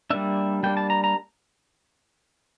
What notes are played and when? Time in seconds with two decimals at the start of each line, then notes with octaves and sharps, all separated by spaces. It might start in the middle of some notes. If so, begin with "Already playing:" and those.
0.10 G3 A#3 D4 E5
0.63 G3 A#3 D4 G5
0.77 A5
0.90 A#5
1.04 A#5